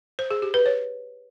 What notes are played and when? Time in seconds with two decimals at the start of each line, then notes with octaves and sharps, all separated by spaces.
0.19 C5
0.31 G#4
0.42 G4
0.54 B4
0.66 C#5